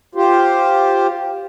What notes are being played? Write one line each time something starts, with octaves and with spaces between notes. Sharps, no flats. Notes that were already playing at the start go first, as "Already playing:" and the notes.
F4 G4 C5